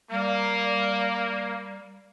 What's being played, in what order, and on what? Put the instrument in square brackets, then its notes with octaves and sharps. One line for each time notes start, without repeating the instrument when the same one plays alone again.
[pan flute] G3 [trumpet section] A#3